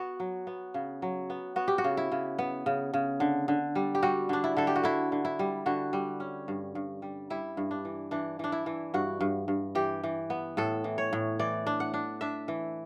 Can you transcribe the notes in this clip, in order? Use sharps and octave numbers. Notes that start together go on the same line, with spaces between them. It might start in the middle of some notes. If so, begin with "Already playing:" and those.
Already playing: B3 F#4
F#3
B3
C#3
F#3
B3
B3 F#4
G4
F#4
C#3
E4
C#3
B3
C#3
C#3
D3
D3
G3
G4
G3 F#4
D3 D4
E4
D3 A4
G4
F#4
D3 E4
D3
E4
G3
D3 F#4
G3
C#4
G2
G2
G3
G3 E4
G2
D4
E3
E3 D4
E3 D4
E4
E3
G2 F#4
G2
G2
E3 G4
E3
B3
A2 A4
E3
C#5
A2
E3 D5
D4
F#5
D4
D4 E5
E3